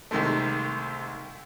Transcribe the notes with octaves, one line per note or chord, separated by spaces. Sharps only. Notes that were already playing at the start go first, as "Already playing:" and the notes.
C2 C3 D#3 G#3 A3